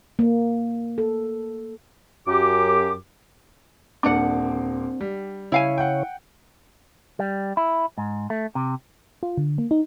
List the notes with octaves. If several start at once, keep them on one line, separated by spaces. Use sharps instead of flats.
A#3
A4
F#2 G4 D6
D#1 A#3 C4 D4 D5 F#5 D6
G3
C#3 E4 C#5 F5 G#5
F#5 G5
G3
E4
G#2
A3
C3
F4
D3
A#3
D#4